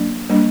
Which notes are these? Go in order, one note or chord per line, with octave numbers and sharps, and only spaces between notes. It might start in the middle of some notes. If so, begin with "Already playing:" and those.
Already playing: F#3 A#3 D4
G3 A#3 D4